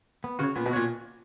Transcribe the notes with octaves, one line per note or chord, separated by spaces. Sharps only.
B3
C#3 F#4 C#5
A#2 B3
B2
A#2 F#4 C#5